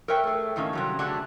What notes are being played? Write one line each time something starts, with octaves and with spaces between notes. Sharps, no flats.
A#4 B4 C#5 E5 G5
A3 G#4
A2 D#3 A#3 C#4
C3 F#3 G3
D3 F#3 A3 D4 F#4 G#4